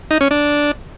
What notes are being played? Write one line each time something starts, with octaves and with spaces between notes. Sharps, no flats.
D#4
C#4
D4